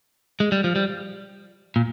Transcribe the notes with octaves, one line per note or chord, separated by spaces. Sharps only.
G#3
G3
F3
G3
A#2